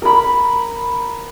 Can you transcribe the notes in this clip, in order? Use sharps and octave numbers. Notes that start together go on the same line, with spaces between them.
A#4 B5